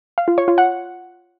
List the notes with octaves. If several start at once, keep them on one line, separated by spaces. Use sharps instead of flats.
F5
F4
C#5
F4
F#5